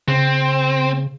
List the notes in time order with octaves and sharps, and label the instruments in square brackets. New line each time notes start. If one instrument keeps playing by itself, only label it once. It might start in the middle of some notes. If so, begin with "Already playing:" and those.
[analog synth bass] C#3 [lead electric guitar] C4